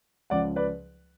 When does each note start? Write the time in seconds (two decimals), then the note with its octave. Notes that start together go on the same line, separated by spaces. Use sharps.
0.30 C#2 C#3 F3 D5 F#5
0.56 B4 D5